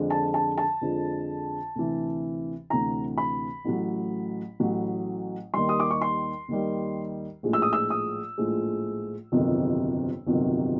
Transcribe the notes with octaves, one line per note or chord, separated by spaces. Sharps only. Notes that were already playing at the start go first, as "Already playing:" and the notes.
Already playing: F2 D3 F3 G#3
A5
A5
A5
F2 D3 F3 G#3
D2 C3 E3
D2 C3 E3 A#5
B5
A1 A2 F#3
A1 A2 F#3
D#2 D#3 G3 C6
D#6
D6
C#6
C6
D#2 D#3 G3
A#1 A2 F3 G#3
E6
D#6
E6
D#6
A#1 A2 F3 G#3
G1 F2 C3 D#3 F#3
G1 F2 C3 D#3 F#3